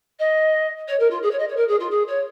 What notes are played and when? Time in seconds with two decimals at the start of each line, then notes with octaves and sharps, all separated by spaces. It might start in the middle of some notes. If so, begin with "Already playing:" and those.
0.19 D#5
0.88 C#5
0.99 A#4
1.10 F4
1.22 G#4
1.31 C#5
1.39 D#5
1.48 C#5
1.56 A#4
1.68 G#4
1.80 F4
1.91 G#4
2.07 C#5